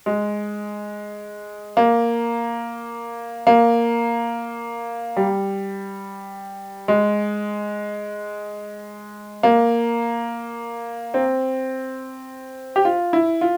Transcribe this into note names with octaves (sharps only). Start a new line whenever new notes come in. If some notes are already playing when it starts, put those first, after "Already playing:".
G#3
A#3
A#3
G3
G#3
A#3
C4
G4
F4
E4
F4